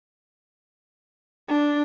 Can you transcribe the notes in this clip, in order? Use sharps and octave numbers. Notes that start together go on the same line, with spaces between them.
D4